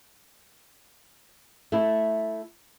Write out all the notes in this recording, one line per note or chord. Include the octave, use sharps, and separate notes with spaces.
A3 E4